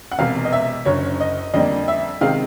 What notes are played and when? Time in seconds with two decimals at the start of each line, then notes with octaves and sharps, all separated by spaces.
0.11 F#5
0.18 E1 E2 C3 F5
0.45 D#5
0.53 E5
0.85 F#1 F#2 D3 C#5
1.20 D#5
1.53 F2 D3 G3 A#3 D#5
1.88 E5
2.21 C3 D#3 G#3 F5